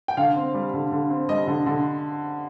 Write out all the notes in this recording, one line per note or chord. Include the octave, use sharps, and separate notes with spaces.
G5
D3 F5
C4
G3
D3
D3
C4
G3 D#5
D3
D3